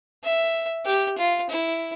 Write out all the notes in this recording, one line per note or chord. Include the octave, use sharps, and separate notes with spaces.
E5
G4
F4
E4